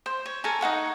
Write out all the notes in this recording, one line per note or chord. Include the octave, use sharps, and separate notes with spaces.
C5
C#5
A4 A#4 G#5 A#5
D#4 C5 F#5 C#6